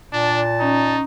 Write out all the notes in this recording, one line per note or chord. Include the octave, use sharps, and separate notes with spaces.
A#2 D4 A5
C#4 D#4 A#5